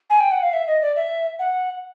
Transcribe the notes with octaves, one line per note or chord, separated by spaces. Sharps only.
G#5
G5
F#5
F5
E5
D#5
D5
E5
F#5